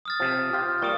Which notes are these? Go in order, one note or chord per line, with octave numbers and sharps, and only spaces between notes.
D#6 F6 A6
C3 F3
F4 G4
G3 A#3 F4 C#6 D#6